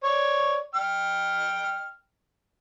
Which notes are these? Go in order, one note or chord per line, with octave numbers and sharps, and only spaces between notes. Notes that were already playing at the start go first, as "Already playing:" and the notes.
C#5 D5
G5 F6